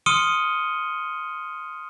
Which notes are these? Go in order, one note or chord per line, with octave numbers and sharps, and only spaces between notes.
C6 D#6 F6 C#7 D#7 G7